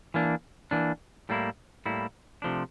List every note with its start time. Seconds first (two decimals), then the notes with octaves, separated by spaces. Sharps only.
0.14 E3 A#3 D4
0.71 E3 A#3 D4
1.29 A2 G3 A#3 E4
1.86 A2 G3 A#3 E4
2.42 C3 F3 A3 D4